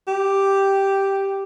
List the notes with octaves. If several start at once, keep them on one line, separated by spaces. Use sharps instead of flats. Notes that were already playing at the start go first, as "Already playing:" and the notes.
G4